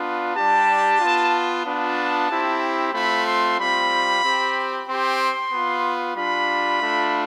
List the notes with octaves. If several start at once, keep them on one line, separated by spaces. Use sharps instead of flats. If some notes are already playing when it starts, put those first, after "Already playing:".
Already playing: B3 D4 F4
G3 D4 G4 A5
B3 F4
B3 D4 F4 A5
C4 E4 G4
A3 C4 F4 B5
C6
G3 C4 F4 B5
C4 G4
C4 G4 C6
B3 F4
G3 D4 F4 B5
A3 D4 F4